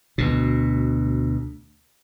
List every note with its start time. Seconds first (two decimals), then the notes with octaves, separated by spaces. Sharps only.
0.18 D2 B2